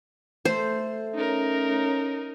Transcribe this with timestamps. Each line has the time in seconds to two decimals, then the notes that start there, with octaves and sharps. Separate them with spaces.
0.45 A3 C5
1.15 C#4 D#4 A#4